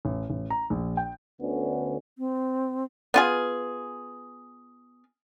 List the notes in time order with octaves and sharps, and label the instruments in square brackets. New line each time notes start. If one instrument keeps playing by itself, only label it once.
[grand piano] A1
A1
A#5
A#1
G5
[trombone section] D2 D3 B3 C#4
[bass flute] C4
[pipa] B3 F4 G#4